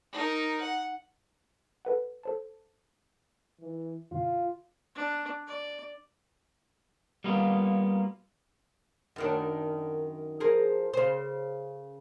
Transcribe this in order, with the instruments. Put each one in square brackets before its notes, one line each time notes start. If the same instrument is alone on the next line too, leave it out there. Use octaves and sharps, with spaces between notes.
[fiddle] D#4 A#4
F#5
[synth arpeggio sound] A4 B4 F#5
A4 C5 A5
[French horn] E3
[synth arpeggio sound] F#2 B2 D3 [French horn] F4
[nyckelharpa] D4
D5
[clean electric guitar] G3 A#3 B3 F4
[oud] F#2 D#3 D4
F3 G#4 A#4
C#3 C5